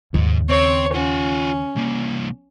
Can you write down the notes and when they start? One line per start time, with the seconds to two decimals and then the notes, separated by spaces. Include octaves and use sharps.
0.14 D#2 G#2 C#3
0.50 C4 C#5
0.95 C#4 F4 F#5
1.76 C2 A#3